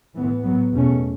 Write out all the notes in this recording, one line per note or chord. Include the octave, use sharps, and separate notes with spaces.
A2 E3 B3
A2 F#3 B3
E2 B2 A3 C#4